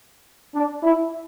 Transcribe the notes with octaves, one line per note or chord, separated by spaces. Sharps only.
D4
E4